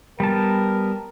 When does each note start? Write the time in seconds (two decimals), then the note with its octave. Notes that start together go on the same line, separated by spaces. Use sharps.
0.20 G3 B3 A#4 A5